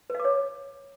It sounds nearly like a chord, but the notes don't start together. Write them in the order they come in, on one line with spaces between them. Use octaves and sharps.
B4 F5 D6 C#5